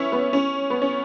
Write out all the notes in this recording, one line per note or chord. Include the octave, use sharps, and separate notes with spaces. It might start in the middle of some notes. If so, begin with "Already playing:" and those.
Already playing: B3 C#4 E4
B3
C#4
B3
C#4